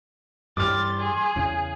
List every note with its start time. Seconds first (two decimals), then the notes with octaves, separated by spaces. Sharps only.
0.57 G2 E3 G3 C6 D6 F6 A6
0.99 G#4
1.36 E2 C#3